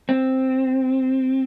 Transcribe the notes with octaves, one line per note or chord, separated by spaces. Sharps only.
C4